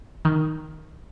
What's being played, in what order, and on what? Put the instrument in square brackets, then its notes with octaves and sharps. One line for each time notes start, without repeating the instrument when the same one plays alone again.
[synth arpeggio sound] D#3